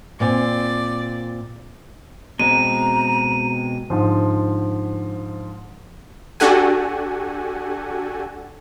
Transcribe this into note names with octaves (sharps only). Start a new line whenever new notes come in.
A#2 C4 D5 G#5
B2 G#3 C4 A#5 D#7
G#2 D3 F3
D4 F#4 G4 A4 F#5 G#5